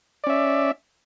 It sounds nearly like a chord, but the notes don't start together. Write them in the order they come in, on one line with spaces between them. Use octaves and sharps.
D5 C#4 E5